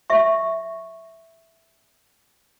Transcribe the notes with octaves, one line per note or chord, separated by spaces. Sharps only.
E5 C#6